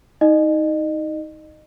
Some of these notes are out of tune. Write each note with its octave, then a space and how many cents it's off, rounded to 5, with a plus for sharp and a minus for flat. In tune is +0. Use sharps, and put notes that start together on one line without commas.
D#4 +20 D#5 -30